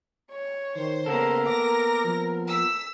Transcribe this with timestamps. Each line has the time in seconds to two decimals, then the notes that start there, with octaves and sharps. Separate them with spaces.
0.31 C#5
0.75 D#3 C5
1.06 C#3 A#3 B3 A4 A#4
1.46 D6 A#6
2.04 F3
2.50 E6 B6